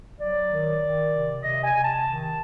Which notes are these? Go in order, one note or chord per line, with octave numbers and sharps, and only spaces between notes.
F#3 D5
D#3
D#3
C3
C3 D#5
G#5
C3
A5
D#3